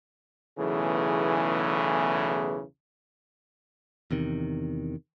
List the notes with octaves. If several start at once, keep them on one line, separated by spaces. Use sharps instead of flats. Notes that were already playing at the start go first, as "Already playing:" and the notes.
B1 E2 C#3 E3 A3 G#4
E2 C3 D#3